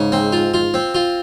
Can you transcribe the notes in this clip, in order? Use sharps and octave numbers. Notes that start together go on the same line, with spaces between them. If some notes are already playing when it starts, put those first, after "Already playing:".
Already playing: G#2 C#3
C4
F4
F4
C4
F4